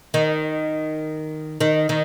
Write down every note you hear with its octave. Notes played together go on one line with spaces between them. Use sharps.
D#3
D#3
D#3